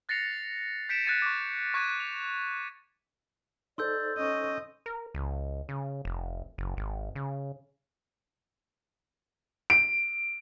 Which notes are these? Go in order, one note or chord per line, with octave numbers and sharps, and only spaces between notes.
F#6 A6 A#6 C7 C#7 F7
G6 B6 C#7 D7 E7
F#6 G#6 A6 B6 C#7 D#7
C#6 D6
C#6 F#6 G#6 A6 D#7
F7
D#4 A4 C5 D5 C6 E6 G6
C#4 D#5
A#4
C#2
C#3
F1
F#1
G#1
C#3
D7